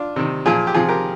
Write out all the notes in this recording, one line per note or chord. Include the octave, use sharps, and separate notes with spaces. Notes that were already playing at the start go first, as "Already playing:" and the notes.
Already playing: D4 F4
C3 D#3
A#2 F3 F4 G#4
G4
C3 F3 F4 G#4
G4 A#4